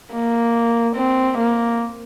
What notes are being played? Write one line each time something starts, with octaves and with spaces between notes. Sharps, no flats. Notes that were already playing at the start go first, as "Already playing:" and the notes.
A#3
C4
A#3